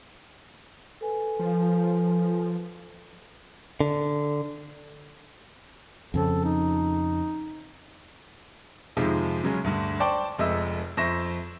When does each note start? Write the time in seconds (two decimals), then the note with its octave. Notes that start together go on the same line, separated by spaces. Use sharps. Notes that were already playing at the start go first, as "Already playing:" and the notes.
1.01 A4 B4 G#5
1.40 F3
3.81 D3
6.14 F2 C#3 C4 A4
6.44 D#4
8.97 F2 C3 D#3 F3 G#3
9.43 C#3 F#3 G#3 C#4
9.64 D2 G2
10.00 C5 D5 G5 A5 C#6 D6
10.38 F1 F2 G#3 D#5 E5 E6
10.97 F2 C5 E5 C#6 A#6 E7